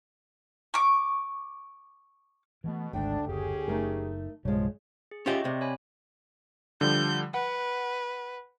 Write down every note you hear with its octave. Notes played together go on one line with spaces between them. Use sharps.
C#6 D6
B2 E3 F3 A3
G#1 D2 G#2 D4 G5
F#1 C#4 G4 G#4
F#1 A3 D#4 A#4
B1 G2 C#3 F3 G3 G#3
G#4
C#4 F4 G4 D#5 E5 C#6
C3 C4 D5
C#5 G#5 B5
D3 F3 G3 G6
B4 F#5